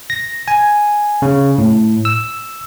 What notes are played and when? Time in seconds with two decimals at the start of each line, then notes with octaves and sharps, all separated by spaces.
0.10 A#6
0.48 G#5
1.22 C#3
1.58 A2
2.05 E6